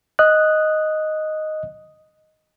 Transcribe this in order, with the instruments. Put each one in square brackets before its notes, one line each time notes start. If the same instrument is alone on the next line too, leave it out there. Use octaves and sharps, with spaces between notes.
[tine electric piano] D#5 D#6 F#6